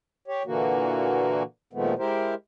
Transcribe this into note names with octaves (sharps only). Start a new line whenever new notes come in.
G4 C#5
A#2 D3 E3 A#3 F#4
A#2 D#3 F3 G#3 A3 B3
G#3 E4 G4 A#4 C5